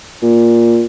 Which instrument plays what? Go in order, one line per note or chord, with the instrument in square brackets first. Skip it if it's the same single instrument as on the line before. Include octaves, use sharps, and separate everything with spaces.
[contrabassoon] A#2